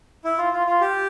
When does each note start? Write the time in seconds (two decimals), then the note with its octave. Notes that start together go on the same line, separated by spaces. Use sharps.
0.24 E4
0.38 F4
0.53 F4
0.67 F4
0.81 G4